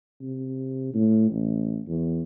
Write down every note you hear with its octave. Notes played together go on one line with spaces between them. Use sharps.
C3
A2
A1
E2